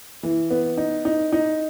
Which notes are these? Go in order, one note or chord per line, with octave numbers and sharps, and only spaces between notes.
E3
B3
D#4
D#4
D#4